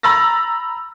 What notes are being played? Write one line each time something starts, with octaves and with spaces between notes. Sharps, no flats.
A#5 B5 E6 A6 A#6